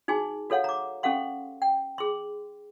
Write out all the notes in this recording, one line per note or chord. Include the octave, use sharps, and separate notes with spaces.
D#4 F#4 G#4 G#5 C6
F#4 A4 C#5 F5 F#5
A#5 D6
C#4 G4 A4 F5 F#5 C6
G5
G#4 C6